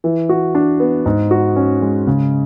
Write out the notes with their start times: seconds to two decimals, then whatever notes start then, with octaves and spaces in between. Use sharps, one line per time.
0.04 E3
0.29 F#4
0.55 D4
0.80 B3
1.06 G#2
1.31 F#4
1.56 C#4
1.82 G#3
2.07 C#3